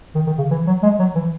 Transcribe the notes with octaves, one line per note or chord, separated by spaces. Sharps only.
D#3
D#3
C#3
E3
F#3
G#3
F#3
E3